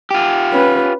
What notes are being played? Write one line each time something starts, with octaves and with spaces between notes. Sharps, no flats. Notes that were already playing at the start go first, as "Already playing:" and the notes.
F4 G4
C#4 B4